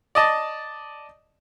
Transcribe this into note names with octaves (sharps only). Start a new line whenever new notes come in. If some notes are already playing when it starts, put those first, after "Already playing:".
D5 D#5 A5